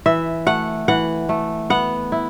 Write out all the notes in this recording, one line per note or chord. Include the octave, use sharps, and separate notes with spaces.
E3 E5
A3 F#5
E3 F#5
A3
B3 F#5
E4